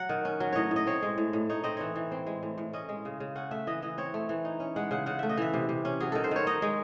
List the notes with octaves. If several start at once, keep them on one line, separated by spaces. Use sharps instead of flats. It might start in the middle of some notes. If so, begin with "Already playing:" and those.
Already playing: F#3 F#5
D#3
C#4
F#3
A2 C#5 D#5
A2 D#5
C4 C#5
G#3
A2
A2
D#4 C#5
C4 D#5
E3 C#5
E3
C4
G#3
A2
A2
C#4 D#5
G#3
C#3
C#3
C#4 F#5
A3 E5
E3 D#5
E3 D#5
C4 C#5
A3
E3
D#4
C#4
G#3 F#5
C#3 F#5
C#3 F#5
A3 E5
D#5
E3 E5
C3
C3
C#4
F#3 G#4
D#3 A4
C5
D#3 C#5
D#4 D#5
G#3